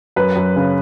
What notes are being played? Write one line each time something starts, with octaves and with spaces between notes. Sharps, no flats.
F#2 B4
F#2
C#3